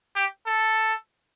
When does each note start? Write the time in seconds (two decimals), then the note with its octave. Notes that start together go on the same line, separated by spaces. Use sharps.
0.15 G4
0.47 A4